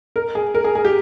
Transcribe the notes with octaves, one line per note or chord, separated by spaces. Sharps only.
A#4
G#4
A#4
G#4
G#4
G4